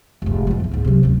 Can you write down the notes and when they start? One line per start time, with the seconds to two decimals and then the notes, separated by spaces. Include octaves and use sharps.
0.22 F1 G#2
0.47 A2 F3
0.60 E2 D3
0.71 D2 G#2
0.84 C3 F#3
1.03 D1 C#4